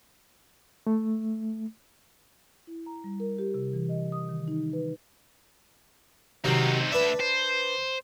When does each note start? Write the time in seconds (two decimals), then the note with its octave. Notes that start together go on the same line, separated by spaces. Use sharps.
0.87 A3
2.67 E4
2.86 A#5
3.04 G3
3.20 A#4
3.38 G4
3.54 C3
3.73 E3
3.89 D#5
4.12 D#6
4.29 D#3
4.48 D#4
4.73 B4
6.44 C3 D#3 F#3 C4 D#4
6.92 D2 D4 B4 E5
7.20 C5